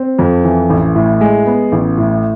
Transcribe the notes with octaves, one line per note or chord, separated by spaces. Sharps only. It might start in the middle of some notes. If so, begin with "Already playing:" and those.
Already playing: C4
F2
E3
A1
A2
G#3
B3
A1
A2